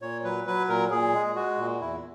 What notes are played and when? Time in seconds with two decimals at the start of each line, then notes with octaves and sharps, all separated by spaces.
0.02 A#2 C#5
0.24 F#3 B4
0.47 F#3 B4
0.69 A#2 A#4
0.91 A#2 G#4
1.13 G#3
1.35 G#3 F#4
1.58 A#2
1.80 E2 E4